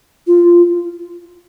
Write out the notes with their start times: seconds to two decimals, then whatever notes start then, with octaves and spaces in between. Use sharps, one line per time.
0.27 F4